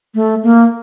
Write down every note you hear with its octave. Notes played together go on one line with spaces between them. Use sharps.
A3
A#3